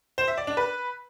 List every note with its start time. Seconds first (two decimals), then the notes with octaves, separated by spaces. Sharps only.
0.18 C5
0.28 E5
0.37 D5
0.47 D4
0.57 B4